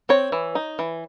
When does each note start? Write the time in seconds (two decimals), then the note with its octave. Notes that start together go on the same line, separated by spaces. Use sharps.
0.09 C4 C#5
0.32 E3
0.55 D#4
0.79 E3